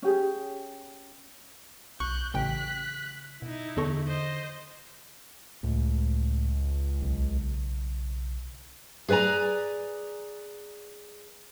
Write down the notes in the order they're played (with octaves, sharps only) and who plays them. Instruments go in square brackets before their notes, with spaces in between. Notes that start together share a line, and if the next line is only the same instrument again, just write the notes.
[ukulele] C#4 G4 G#4
[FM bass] B1 [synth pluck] C#6 [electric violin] F#6 G6
[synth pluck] A1 G5 [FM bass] C#3 [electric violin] F#6 B6
[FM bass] B2 [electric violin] D#4 E4
[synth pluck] E2 A4 C#6 [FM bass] D3
[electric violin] C5 D#5
[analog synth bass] C#2 [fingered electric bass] A2
[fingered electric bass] B1 C#3
[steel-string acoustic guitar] G#4 B4 D5 G#5 A#5